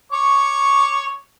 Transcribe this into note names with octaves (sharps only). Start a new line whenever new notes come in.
C#5 C#6 D6